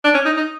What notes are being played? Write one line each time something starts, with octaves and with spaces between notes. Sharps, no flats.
D4
C#4
D#4
D#4